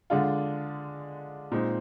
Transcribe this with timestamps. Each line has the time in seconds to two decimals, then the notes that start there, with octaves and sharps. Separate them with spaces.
0.10 D3 G#3 D4 F4
1.52 A#2 G#3 C4 D#4